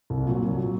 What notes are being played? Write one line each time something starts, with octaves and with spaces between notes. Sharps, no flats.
C2
A#2 F#3
C2
A#2 F#3